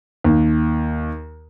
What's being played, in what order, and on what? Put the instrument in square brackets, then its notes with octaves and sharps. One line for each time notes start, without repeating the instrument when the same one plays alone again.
[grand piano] D#2